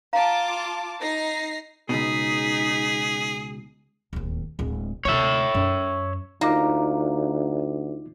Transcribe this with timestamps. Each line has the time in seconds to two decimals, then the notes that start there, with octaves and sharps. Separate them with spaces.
0.13 F4 F5 A5 A#5 D6
1.01 D#4 A#6 C7
1.89 C#2 B2 D#4 G#4 B6
4.13 D1 D#2
4.59 D1 G#3
5.05 D2 C3 C#5 E5
5.55 F#2
6.41 D2 A#3 D#4 F4 D6